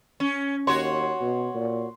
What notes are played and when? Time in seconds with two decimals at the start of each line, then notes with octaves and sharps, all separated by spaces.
0.20 C#4
0.67 D#2 F#4 C#5 C6
1.21 B2
1.55 A#2